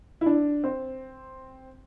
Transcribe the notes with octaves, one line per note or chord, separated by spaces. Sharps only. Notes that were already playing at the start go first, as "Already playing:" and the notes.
E4
D4
C4